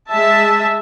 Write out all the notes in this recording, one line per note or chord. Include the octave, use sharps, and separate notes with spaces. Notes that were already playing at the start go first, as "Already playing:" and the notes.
G#3 E5 A5